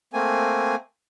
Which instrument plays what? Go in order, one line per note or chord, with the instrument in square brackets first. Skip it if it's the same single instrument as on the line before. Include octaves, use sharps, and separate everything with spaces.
[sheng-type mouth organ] A3 A#3 C4 G#5